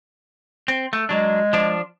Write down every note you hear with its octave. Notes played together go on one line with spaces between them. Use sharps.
C4
A3
F#3 G#3 D4
F3 D4